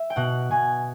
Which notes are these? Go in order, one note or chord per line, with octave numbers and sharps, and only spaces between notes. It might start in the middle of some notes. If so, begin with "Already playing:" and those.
Already playing: E5
G5
B2 F#5
B2 G#5